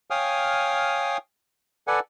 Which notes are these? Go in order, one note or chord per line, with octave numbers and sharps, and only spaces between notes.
C#5 F5 G5 G#5 D#6 F6
A4 B4 D5 F#5 G#5